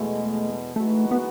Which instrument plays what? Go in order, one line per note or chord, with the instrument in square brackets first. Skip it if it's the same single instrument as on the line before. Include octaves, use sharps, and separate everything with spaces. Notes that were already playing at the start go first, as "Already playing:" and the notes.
Already playing: [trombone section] E2 B2 G#3 [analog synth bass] A3
[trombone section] E3 G#3 D#4 F#4 B4 [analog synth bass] A3
[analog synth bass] B3